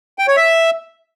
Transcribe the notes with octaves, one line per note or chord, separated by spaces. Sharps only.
G5
C#5
E5